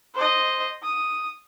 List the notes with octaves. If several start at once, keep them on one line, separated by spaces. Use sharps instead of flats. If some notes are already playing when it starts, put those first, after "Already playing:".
C5 D#5
D#6